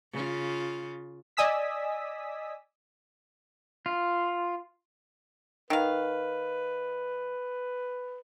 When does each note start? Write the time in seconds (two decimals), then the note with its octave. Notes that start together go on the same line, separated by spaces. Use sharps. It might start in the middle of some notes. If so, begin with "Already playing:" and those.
0.13 C#3 F4
1.37 D5 D#5 G#5 D#6 E6 B6
3.86 F4
5.70 D#3 B4 F5